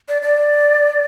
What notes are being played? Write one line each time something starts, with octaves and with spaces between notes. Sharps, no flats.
D5
D5